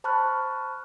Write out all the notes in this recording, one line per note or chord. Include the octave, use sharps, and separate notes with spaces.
C5 A5 B5 C#6 F6 F#6